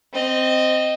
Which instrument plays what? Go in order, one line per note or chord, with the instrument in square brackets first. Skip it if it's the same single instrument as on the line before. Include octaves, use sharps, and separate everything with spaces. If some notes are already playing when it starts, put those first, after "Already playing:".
[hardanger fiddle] C4 D#5